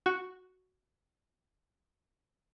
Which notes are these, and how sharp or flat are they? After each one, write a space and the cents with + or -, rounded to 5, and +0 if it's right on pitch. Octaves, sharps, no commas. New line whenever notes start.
F#4 +0